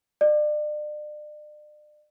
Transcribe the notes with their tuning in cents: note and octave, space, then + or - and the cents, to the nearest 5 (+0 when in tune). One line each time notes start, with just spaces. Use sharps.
D5 +40